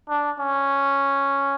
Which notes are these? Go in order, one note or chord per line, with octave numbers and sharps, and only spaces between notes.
D4
C#4